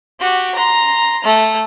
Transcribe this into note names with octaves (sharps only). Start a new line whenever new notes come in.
F#4 G4
A#5 C6
A3